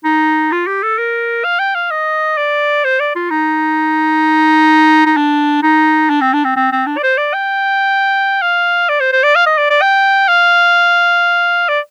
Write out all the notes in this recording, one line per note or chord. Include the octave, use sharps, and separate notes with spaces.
D#4
F4
G4
A4
A#4
F5
G5
F5
D#5
D5
C5
D5
F4
D#4
D#4
D4
D#4
D4
C4
D4
C4
C4
C4
D4
D5
C5
D5
G5
F5
D5
C5
C5
D5
F5
D#5
D5
D5
G5
F5
D5